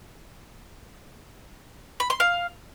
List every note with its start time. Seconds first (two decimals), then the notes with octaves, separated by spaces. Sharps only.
2.00 B5
2.10 C6
2.20 F5